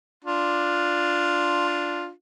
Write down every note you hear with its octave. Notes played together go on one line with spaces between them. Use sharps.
D4 F4